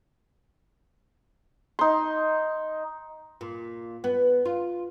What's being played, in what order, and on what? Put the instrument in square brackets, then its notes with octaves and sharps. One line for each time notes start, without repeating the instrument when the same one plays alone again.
[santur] D#4 C6
[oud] A#2
B3
F4